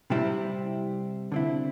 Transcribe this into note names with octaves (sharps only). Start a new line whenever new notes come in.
C3 G3 C4 E4
D3 C4 E4